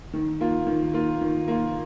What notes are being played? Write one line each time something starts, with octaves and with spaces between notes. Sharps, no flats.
D#3
A#3 F4
D#3
A#3 F4
D#3
A#3 F4